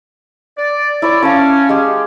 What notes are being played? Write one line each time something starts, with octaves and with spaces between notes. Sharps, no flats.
D5
E4 C#5 D5
C#4 F5 A5 D6
G#3 G4